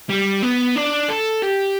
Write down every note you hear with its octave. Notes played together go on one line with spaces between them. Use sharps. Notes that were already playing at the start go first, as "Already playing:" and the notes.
G3
B3
D4
A4
G4